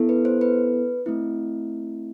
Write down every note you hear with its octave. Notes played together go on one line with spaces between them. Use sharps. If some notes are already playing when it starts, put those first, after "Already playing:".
Already playing: B3 E4 A4
B4
C5
B4
A3 C4 E4